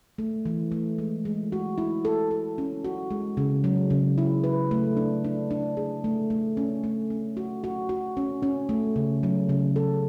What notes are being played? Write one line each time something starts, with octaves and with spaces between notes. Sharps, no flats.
A3
E3
A3
G#3
G#3
F#4
E4
A4
A4
C#4
F#4
G#3
C#3
F#3
C#3
E4
B4
A3
D4
D4
D4
G#4
A3
A3
C#4
A3
C#4
F#4
F#4
F#4
C#4
C#4
A3
C#3
F#3
C#3
A4